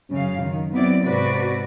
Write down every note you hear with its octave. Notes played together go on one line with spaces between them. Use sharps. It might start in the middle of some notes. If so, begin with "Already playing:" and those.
F#2 C#3 F5
D#3
F#3 B3 C4 E4 D5
G#2 C3 C4 F#4 B4 D5